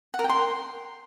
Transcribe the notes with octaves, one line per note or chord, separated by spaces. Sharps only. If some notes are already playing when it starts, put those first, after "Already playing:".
F#5
A#4
G5
C6